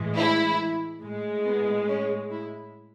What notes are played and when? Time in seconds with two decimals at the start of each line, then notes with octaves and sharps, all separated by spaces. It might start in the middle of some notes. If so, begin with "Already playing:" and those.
Already playing: A2 E3 G#3
0.16 E4
1.02 A2 G#3
1.45 B3
1.88 C#4
2.30 E4